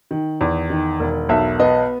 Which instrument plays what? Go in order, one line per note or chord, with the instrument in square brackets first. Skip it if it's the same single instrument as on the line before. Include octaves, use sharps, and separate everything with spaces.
[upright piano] D#3
E2
D#3
E1
B1 E5
B3 D#5